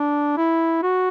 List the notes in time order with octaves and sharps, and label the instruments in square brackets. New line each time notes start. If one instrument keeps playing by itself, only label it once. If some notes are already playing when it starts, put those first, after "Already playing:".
Already playing: [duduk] D4
E4
F#4